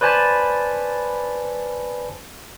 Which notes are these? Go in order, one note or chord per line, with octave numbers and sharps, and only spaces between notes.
B4 C5 D5 G#5 A5 B5